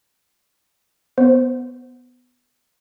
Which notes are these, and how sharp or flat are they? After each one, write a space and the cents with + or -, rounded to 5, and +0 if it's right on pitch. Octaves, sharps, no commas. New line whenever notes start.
B3 +10 C5 +0